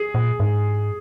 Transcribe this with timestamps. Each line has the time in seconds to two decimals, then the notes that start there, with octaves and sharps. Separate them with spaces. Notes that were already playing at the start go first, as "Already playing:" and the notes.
Already playing: G#4
0.15 A#2
0.40 G#2